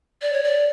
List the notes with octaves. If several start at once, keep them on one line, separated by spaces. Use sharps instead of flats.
D5
C#5
D5